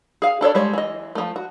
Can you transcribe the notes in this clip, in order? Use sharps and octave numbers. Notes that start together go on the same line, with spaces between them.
G#4 F5
D4 A4 C#5 D5
G3 G#3 C#5
E3 D#5
F3 A3
F#4